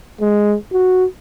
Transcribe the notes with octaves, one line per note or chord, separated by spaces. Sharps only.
G#3
F#4